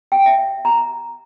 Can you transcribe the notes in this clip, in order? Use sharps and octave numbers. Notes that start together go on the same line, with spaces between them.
G5
E5
A#5